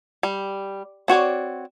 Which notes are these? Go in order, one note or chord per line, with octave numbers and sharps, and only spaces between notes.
G3
C4 F#4 C#5 D5